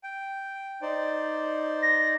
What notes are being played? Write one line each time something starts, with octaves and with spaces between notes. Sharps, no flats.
G5
D#4 C5 D5
A#6